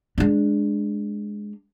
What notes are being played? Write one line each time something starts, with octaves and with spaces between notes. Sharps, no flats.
G#3 D4